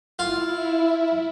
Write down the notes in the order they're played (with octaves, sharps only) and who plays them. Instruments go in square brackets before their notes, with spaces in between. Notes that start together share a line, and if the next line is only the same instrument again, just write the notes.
[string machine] E4 [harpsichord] F4